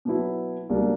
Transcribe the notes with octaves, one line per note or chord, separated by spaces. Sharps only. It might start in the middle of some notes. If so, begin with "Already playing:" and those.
B2 F#3 B3 E4
C#2 B2 G3 A#3 D4